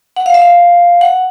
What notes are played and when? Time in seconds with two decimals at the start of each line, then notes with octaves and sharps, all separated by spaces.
0.16 F#5
0.26 F5
0.34 E5
0.42 F5
1.01 F#5